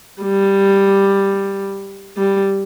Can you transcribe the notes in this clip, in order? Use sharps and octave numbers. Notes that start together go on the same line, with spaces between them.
G3
G3